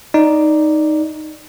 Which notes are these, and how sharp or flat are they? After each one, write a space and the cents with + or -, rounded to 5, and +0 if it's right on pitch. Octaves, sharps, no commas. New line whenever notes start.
D#4 +0 D5 -5